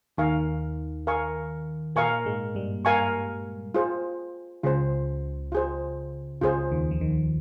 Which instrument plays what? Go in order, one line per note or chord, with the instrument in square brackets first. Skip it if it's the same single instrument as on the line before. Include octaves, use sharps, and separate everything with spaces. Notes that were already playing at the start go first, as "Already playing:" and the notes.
[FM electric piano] D#2 D#3 [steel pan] A#4 F5 G#5 C#6
[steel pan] A#4 F5 G#5 C#6
[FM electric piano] A#2 A#3 [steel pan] A#4 F5 G#5 C#6
[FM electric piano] G#2 G#3
G2 G3
[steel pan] A#4 F5 G#5 C#6
F4 G#4 C5
[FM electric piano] C#2 C#3 [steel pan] F4 G#4 C5
[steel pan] F4 G#4 C5
[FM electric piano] C#2 C#3 [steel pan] F4 G#4 C5
[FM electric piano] D#2 D#3
F3
D#2 D#3